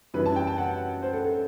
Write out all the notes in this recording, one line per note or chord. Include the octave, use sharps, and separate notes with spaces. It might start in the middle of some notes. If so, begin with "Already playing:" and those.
F#2 E3 G3 B4
A5
G5
A5
F#5
C5
A4
A4